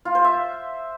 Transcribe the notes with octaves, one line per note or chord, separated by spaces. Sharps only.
F4
C5
E5